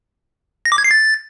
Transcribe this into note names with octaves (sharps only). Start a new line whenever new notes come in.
A#6
D6
G#6
C7
A6